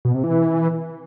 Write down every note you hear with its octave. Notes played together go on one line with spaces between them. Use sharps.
B2
C3
E3